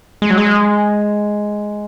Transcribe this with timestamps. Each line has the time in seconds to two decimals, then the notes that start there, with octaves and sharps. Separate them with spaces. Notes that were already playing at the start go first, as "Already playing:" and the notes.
0.22 G#3
0.30 F#3
0.38 G#3